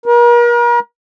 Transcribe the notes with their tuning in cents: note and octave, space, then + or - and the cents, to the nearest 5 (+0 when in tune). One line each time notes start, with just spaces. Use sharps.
A#4 +40